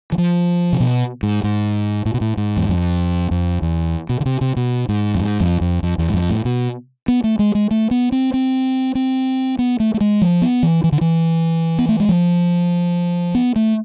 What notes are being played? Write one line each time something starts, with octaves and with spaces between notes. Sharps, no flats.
E3
F3
C3
B2
G#2
G#2
A2
B2
A2
G#2
E2
F2
F2
E2
B2
D3
C3
C3
B2
G#2
F2
G#2
F2
F2
F2
E2
G#2
F2
A2
B2
B3
A3
G#3
G#3
A3
B3
C4
C4
C4
B3
A3
A3
G#3
F3
B3
E3
E3
D3
E3
B3
A3
G#3
F3
B3
A3